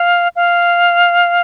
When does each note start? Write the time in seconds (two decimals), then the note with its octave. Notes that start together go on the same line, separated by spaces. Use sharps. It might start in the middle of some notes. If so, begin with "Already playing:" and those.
Already playing: F5
0.36 F5